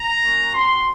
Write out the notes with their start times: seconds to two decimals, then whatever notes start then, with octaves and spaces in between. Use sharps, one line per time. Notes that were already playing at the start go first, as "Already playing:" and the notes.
Already playing: A#5
0.20 A#3 C#4 F#4
0.54 C4 F#4 C6